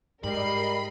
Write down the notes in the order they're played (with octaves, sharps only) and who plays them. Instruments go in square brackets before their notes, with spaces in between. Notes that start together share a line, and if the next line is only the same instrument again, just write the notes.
[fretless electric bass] G#2 [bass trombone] G3 [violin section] A#4 D#5 C7 [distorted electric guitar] B5